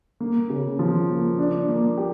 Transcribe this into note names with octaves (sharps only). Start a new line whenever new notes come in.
A#3
C#3
F3
A#3
D4
A#3
G4